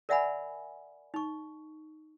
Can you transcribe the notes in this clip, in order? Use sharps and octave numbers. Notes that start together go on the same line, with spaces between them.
A#4 D5 E5 F#5 G#5 B5
D#4 C#6